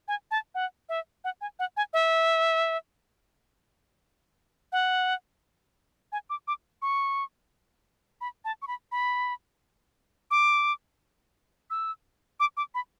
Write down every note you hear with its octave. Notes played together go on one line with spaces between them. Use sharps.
G#5
A5
F#5
E5
F#5
G#5
F#5
G#5
E5
F#5
G#5
D6
D6
C#6
B5
A5
C#6
B5
B5
D6
E6
D6
D6
B5